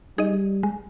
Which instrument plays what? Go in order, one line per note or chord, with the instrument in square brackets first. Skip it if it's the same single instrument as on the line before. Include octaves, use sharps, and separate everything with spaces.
[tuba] G3 [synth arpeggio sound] D#4 G#4 D#5
[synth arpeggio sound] G#3